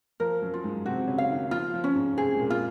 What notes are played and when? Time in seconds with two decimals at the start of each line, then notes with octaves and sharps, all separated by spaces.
0.20 F3 A#4
0.42 F#2 F#3
0.54 F4
0.64 G#2 G#3
0.85 C3 C4 F#4
1.08 C#3 C#4
1.18 F5
1.30 D#3
1.51 F3 F4
1.74 F3
1.84 C#4
1.95 G#2 G#3
2.17 C3 C4 G#4
2.35 G#3
2.39 A#2 A#3
2.50 F4